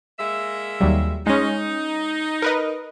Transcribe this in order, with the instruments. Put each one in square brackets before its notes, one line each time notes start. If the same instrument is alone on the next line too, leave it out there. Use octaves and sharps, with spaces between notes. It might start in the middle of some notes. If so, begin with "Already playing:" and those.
[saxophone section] G#3 A#3 E5
[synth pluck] D#2 F#3 G3
[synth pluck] G#3 C#4 [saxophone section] D#4
[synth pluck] A#4 B4 D#5